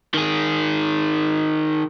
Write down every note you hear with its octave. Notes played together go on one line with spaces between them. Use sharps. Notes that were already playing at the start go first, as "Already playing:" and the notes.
D#3 G#4